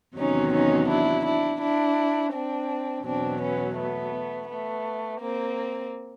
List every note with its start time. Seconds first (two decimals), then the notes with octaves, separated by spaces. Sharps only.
0.17 E2 C3 D#3 F#3 C#4 D#4
0.53 C#4 D#4
0.89 D4 E4
1.25 D4 E4
1.61 D4 E4
2.33 C4 D4
3.05 E2 B2 F#3 C4 D4
3.41 B3 C#4
3.77 A3 B3
4.49 A3 B3
5.20 A#3 C4